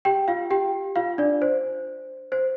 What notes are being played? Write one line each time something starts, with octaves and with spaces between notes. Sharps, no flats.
G4 G5
F4 F5
G4 G5
F4 F5
D4 D5
C5
C5